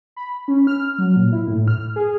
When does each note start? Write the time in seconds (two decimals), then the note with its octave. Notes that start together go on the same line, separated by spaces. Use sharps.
0.16 B5
0.48 C#4
0.67 F6
0.98 F#3
1.16 A#2
1.32 E4
1.48 A2
1.68 F6
1.96 G#4